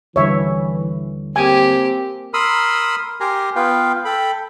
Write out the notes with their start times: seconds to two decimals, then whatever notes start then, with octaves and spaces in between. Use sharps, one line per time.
0.16 D#2 D3 E3 G3 C#5 E5
1.36 A#3 C4 G4 G#5
2.34 A#4 B5 C6 D#6 E6
3.20 G4 A#4 G#5 A#5 C6
3.56 B3 F4 B4 F5 G5
4.05 A4 G5 B5